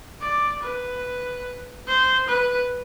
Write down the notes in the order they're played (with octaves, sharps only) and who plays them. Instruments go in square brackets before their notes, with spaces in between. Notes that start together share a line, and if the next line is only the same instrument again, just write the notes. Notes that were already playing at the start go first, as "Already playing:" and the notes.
[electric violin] D5
B4
C5
B4